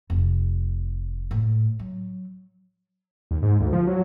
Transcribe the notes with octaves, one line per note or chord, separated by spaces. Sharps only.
F1
A2
F#3
D#2
G#2
D2
F3
F#3